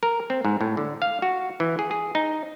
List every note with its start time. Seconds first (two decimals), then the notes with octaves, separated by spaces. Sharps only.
0.03 A#4
0.30 C4
0.45 G#2
0.61 A2
0.77 D3
1.02 F5
1.22 F#4
1.60 E3
1.79 G#4
1.91 G#4
2.15 D#4